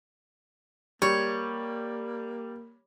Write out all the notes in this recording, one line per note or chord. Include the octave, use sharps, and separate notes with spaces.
G3 A#3 C#5